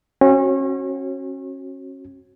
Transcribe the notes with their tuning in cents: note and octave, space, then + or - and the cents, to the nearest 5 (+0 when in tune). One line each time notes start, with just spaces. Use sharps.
C#4 -35 F#4 +0